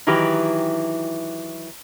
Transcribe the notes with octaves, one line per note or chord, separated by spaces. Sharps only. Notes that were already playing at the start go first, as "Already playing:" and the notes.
D#3 E3 F#3 E4 G4 B4